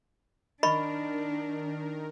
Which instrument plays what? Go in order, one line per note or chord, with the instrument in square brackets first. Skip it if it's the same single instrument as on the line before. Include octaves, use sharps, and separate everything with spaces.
[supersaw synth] D#3 A#4 [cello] D4 [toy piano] D#5 B5 C#6